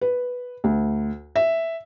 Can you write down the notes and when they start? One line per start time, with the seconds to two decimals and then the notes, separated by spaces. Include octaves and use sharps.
0.01 B4
0.64 D2
1.36 E5